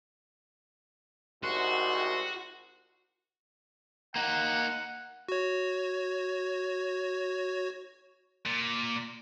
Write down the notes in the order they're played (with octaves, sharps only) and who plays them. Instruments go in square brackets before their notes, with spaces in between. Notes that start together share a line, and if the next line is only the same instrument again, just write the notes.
[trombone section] C2 G#2 D#3 [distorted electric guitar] F#4 [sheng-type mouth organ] C6
[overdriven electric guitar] A#3 D#4 [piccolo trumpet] F#5
[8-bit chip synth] F#4 C#5
[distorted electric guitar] A#2